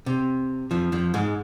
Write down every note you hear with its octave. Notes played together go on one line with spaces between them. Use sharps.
C3
F2 F3
F2 F3
G#2 G#3